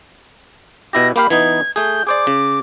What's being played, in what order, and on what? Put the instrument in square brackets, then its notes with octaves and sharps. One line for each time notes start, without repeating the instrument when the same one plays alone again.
[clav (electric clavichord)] B2 E4 G4 [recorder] A#6
[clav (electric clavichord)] A#3 G4 F5 [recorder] B5
[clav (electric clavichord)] E3 B3 D#4 [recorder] G#6
[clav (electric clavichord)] A3 G#4 [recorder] G6
[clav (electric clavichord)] G#4 C5 D5 [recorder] D6
[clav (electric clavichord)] C#3